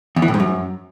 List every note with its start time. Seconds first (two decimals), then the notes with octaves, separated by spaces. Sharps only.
0.16 E2
0.22 E3
0.28 A2
0.34 G#2
0.40 F#2